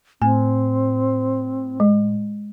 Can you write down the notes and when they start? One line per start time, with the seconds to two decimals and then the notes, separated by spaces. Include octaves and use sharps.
0.22 A2 C4 G#5
1.80 G#3